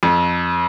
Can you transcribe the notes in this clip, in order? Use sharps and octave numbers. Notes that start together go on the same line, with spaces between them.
F2